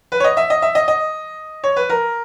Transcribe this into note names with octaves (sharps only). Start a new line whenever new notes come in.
B4
C#5
D#5
E5
D#5
E5
D#5
D#5
C#5
B4
A#4